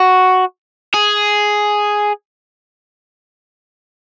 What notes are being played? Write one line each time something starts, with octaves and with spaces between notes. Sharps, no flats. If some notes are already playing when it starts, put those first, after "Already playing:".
Already playing: F#4
G#4